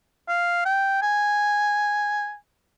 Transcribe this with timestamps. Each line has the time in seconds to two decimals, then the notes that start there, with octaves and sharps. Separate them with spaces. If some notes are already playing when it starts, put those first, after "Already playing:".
0.28 F5
0.65 G5
1.02 G#5